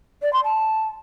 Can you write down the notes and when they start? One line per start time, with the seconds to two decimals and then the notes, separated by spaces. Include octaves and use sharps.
0.21 D5
0.33 C6
0.44 A5